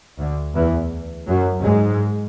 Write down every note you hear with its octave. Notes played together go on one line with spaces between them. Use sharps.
D2 D3
E2 E3
F#2 F#3
G#2 G#3